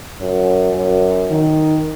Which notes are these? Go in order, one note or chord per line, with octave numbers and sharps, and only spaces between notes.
F#2
F#2
D#3